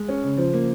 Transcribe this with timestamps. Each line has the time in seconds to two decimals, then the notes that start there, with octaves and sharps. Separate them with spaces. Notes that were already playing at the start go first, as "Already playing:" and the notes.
Already playing: G#3
0.09 C#4
0.24 C#3
0.38 F3
0.54 A#3